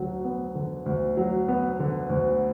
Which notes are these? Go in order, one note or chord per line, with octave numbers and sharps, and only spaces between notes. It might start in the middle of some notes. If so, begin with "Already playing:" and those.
Already playing: D2 D3 F#3
B3
D3
D2
F#3
B3
D3
D2